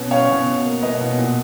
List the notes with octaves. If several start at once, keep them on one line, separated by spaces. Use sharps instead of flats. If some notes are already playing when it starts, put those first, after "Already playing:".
Already playing: B2 B3 C#4
C#4 C#5 F5
B2
B2
A#3
B2 B4 D#5
B2
A#2